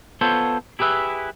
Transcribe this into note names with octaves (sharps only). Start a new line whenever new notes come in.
B3 F4 A4 C5 C#5
E4 G4 G#4 B4 E5